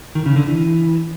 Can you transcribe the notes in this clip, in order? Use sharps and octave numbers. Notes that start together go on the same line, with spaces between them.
D#3
C#3
D3
E3